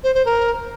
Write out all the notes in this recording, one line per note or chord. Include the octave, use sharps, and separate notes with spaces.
C5
C5
A#4